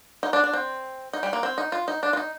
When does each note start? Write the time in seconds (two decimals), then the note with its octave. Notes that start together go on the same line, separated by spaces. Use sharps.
0.23 D#4
0.33 D4
0.44 D4
0.53 C4
1.13 D#4
1.23 G3
1.33 A#3
1.43 C4
1.58 D#4
1.72 F4
1.88 D#4
2.03 D4
2.13 F4
2.17 D#4